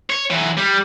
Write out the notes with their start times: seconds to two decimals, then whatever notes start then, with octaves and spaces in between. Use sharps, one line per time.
0.10 C#5
0.30 E3 F#3
0.57 G3